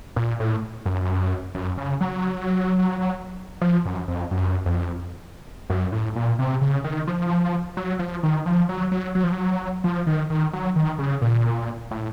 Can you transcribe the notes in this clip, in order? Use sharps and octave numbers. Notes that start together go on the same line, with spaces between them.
A#2
A2
F#2
F#2
C#3
F#3
F3
F#2
F2
F#2
F2
F#2
A2
A#2
C3
C#3
D#3
F3
F#3
F3
D#3
F3
F#3
F#3
F#3
F3
F#3
F3
D#3
D#3
F#3
D#3
C#3
A#2
A2